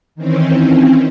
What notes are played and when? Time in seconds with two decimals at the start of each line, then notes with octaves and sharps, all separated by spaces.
0.15 D#3 E3 C4 C#4